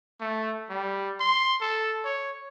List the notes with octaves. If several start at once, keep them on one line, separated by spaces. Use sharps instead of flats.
A3
G3
C6
A4
C#5